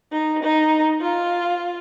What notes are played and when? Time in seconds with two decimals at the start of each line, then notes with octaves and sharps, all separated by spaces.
0.12 D#4
0.43 D#4
1.01 F4